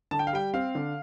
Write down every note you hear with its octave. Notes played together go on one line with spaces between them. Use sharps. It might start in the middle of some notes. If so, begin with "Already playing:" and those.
D3 A5
G5
F5
G3 G5
C4 F5
D3